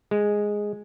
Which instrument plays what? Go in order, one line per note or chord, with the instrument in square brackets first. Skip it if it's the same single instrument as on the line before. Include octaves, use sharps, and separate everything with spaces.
[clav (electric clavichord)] G#3